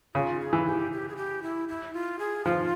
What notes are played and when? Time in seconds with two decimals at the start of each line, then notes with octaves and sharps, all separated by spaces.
0.15 C#3 F4
0.40 G#4
0.53 E3
0.66 G4
0.92 G4
1.09 G#4
1.17 G4
1.43 E4
1.69 E4
1.94 F4
2.19 G#4
2.45 F3 F4